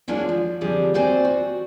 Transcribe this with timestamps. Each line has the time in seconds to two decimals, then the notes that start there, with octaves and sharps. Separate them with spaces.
0.08 F#3 G#3 A#3 D4 F4 C#5
0.29 F3
0.61 D3 F3 G3 C4 D4 G#4
0.94 A#3 C4 F#4 C5 D5 G#5
1.25 F#4